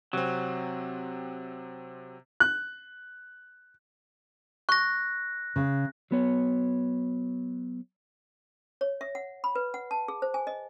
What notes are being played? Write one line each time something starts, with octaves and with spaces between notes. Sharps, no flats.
C3 F#3 C4
F#6
C#6 F#6 A#6
C#3
F#3 B3 C#5
C#5
E5
F#5
B5
B4
F#5
A5
G#4
C5
G#5
D#5